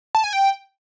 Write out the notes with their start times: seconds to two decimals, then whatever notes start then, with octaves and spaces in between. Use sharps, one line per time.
0.15 A5
0.24 G#5
0.33 G5